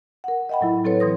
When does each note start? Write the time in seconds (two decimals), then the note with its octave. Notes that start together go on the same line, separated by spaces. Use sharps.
0.24 A#4 F#5
0.49 D#5 E5 F#5 G5 B5
0.61 A2 F#3 E4
0.84 F#3 C4 A4 B4 C#5
1.00 E3 C6 D#6 A#6